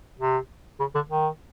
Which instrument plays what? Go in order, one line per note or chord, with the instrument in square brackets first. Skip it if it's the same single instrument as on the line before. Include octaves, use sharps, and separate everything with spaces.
[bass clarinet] C3
C#3
D3
D#3